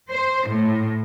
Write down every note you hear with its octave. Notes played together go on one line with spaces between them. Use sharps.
C5
A2